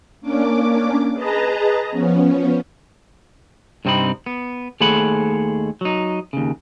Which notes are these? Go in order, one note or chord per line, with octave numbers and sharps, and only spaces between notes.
A#3 C#4 D4 D6
G#4 B4 D#5 A5 A#5
F3 B3 C#4
G2 C3 C4 D#4 B5
B3
D#2 A3 G#4 C5 F#5 B5
F#3 D#4
D#2 C#3